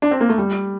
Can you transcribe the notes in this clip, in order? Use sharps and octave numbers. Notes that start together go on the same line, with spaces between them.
D4
C4
A#3
A3
G3